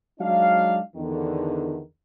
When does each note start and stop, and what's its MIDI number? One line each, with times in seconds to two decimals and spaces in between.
0.20 0.80 54
0.20 0.80 56
0.20 0.80 62
0.20 0.80 63
0.20 0.80 77
0.96 1.80 40
0.96 1.80 50
0.96 1.80 51